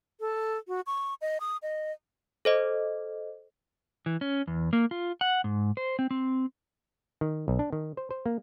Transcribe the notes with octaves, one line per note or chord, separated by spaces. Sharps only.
A4
F#4
C#6
D#5
D#6
D#5
A4 C5 D#5
E3
C#4
E2
A#3
F4
F#5
G#2
C5
C4
C4
D#3
B1
D4
D#3
C5
C5
A#3